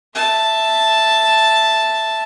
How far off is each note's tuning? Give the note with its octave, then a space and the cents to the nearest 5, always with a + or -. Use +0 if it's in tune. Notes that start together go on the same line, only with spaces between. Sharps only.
E5 +0 A5 +0